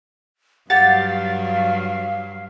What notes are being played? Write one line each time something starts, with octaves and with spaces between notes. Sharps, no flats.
G2 F#3 G4 F5 F#5 A6